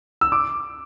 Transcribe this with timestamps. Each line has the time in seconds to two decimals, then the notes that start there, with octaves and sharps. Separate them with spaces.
0.21 E6
0.32 D6